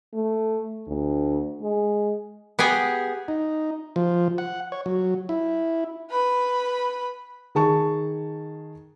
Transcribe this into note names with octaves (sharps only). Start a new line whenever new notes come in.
A3
D2
G#3
B3 G4 G#4 G#5
D#4
F3
F#5
C#5
F#3
E4
B4 B5
D#3 G#4 A5 C#6